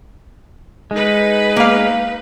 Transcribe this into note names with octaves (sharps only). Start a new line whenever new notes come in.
G#3 D#4 B4
A#3 F5